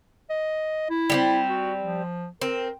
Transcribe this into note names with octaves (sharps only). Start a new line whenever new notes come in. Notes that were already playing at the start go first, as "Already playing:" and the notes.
D#5
E4
G3 A#3 C4
F#4
F3
C4 A#4